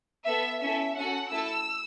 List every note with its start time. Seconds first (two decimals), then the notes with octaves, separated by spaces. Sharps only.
0.27 B3 A4 E5
0.61 C#4 E4 A4 E5
0.97 C#4 F#4 A4 F#5
1.31 A3 E4 A4 E6